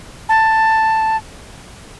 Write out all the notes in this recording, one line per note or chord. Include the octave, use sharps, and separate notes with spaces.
A5